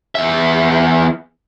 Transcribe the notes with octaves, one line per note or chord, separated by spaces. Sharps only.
E2 E5